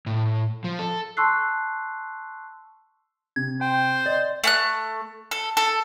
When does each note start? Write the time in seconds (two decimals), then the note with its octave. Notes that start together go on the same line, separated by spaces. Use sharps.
0.06 A2
0.64 F3
0.79 A4
1.17 A5 C6 C#6 E6 F#6 C7
3.36 C3 G#6
3.61 C5 G5
4.06 D5 D#5
4.44 A3 G#5 F#6
5.31 A4
5.57 A4